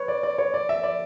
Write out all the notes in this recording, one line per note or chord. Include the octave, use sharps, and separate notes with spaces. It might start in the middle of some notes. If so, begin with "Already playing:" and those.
Already playing: B4 C#5
D5
D5
C#5
D5
E5
D5